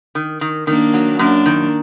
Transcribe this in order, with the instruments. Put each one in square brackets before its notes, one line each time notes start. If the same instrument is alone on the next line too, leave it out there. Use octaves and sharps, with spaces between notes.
[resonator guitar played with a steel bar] D#3
D#3
[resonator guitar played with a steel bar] D#3 [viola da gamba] A#3 D4
[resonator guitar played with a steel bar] F#3
[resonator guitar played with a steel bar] F#2 [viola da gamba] A#3 D4
[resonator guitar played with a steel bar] D#3